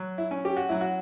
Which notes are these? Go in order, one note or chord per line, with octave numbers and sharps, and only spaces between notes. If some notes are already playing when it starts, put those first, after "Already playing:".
Already playing: F#3
E4
C#4
G4
F#4
F#3 E4
F#4